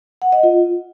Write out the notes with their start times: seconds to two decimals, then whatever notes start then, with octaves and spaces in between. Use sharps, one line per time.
0.22 F#5
0.32 D#5
0.43 F4